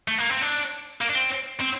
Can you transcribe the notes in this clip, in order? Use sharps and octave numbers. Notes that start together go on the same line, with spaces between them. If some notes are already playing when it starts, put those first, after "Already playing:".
A3
A#3
C4
D4
A#3
D4
C4
C4